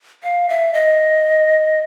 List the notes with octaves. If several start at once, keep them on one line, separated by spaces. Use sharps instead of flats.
F5
E5
D#5